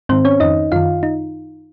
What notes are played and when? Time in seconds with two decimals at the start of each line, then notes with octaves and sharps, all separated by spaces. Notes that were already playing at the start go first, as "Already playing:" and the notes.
0.09 G#2 D#3 C4 C5
0.25 C#4 C#5
0.40 F2 D#3 D#4 D#5
0.72 F#2 D#3 F4 F5
1.03 D#4